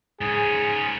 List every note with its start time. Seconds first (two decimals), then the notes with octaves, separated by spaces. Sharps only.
0.21 G#2 C#4 G#4